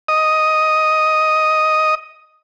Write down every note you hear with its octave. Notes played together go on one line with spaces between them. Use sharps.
D#5 D#6